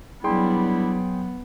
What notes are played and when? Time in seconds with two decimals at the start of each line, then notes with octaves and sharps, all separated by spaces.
0.24 F#3 G3 B3 D4 E4 G#4 G5 C6